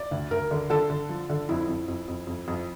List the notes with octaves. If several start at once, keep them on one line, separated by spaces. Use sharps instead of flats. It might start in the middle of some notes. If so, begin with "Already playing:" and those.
Already playing: D5
D2
D2 A#4
D3
D3 A4
D3
F3
D3
F2 E4
F2
F2
F2
F2
F2